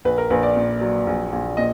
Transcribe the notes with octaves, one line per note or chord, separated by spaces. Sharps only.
A#1 B4
A#4
A#1 B4
D5
A#2
F#3
A#1
A#1
A#2 D#5